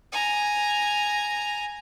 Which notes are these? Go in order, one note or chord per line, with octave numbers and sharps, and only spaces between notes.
G#5 A#5